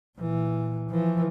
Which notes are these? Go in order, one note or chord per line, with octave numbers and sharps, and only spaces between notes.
A#2 E3
E3 F3